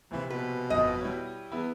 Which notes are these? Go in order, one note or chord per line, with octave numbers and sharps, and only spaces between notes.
A#1 C3 E3
B2 B4
G1 F2 D#5
G3 E4 C#5
E2 B3 E4